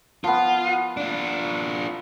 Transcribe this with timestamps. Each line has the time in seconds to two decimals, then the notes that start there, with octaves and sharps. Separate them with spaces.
0.24 F3 B3 F4
0.97 D4 F4